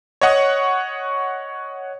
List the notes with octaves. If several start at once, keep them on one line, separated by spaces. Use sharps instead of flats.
C#5 D#5 F#5 C#6 D#6